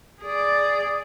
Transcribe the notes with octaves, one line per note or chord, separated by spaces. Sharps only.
G#4 D5